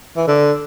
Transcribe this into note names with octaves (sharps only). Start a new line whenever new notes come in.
E3
D3